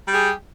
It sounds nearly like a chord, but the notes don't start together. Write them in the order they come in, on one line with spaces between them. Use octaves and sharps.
G3 G4 G#4